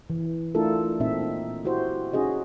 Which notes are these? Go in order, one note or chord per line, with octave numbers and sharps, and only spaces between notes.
E3
A3 D4 E4 F4 A4 A#4
A#2 C4 D#4 E5
D#4
E4 F#4 G4 C5
C#4 D#4 F#4 G#4 D#5